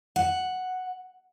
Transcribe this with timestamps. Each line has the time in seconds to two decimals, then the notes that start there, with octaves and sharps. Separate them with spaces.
0.16 F#5